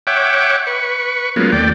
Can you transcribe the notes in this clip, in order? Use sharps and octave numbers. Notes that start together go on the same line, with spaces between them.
C#5 E5 F#5 G5 D6
B4 C#6
F#3 G#3 A#3 B3 C#4 F4
D#2 A3 D5 G5